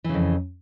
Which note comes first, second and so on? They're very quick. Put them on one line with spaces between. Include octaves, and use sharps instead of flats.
E3 C#3 F2